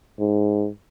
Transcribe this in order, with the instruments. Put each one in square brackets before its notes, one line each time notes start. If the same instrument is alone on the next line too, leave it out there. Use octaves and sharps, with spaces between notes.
[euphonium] G#2